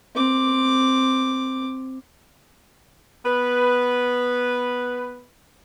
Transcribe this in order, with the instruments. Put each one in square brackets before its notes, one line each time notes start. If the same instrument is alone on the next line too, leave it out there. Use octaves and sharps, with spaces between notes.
[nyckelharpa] C4 D6
[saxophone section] B3 B4